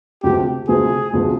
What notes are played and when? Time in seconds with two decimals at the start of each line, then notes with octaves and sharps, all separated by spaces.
0.23 D2 C3 F3 G#3 C4 G4
0.68 D2 C3 F3 G#3 C4 G#4
1.13 D2 C3 F3 G#3 C4